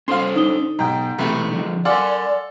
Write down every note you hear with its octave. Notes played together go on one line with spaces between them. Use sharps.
C#4 A4 C5 F5 C6
D3 D#4 D#6 G7
B1 G#2 G4 G5 A#5
B1 C3 E3 A3 B5
D3 F3
A4 A#4 D5 F5 F#5 G#5 C6 D6